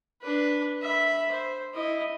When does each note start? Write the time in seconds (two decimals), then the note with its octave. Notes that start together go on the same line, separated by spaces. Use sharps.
0.21 D4 B4
0.82 E5 B5
1.31 C5
1.74 E4 D#5